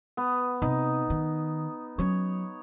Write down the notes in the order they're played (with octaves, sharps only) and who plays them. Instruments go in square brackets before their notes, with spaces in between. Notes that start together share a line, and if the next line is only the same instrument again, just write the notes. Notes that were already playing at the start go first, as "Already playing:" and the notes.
[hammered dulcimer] B3
[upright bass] C3 [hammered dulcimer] D#4
[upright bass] D#3
[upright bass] F#3 C#4 [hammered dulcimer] C#5